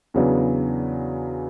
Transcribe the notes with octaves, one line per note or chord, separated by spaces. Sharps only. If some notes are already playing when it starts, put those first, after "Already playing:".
E2 C#3 F#3 B3 D4